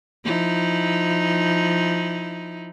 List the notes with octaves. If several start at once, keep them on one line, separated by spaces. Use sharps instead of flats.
F3 D#4 E4